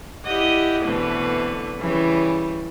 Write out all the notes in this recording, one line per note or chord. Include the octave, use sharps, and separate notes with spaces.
E4 G4 D5 D#5 F#5
B2 D3 E3 A3 C4 B4
C#3 E3 G3